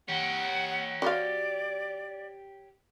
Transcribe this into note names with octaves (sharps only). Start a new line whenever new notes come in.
G4 C#5 F#5
F#4 C5 D5 F5